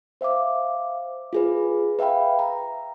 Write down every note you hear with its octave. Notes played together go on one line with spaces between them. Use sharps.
C5 E5 F5 D6
F4 G#4 B4
B4 E5 F5 G5 B5
A#5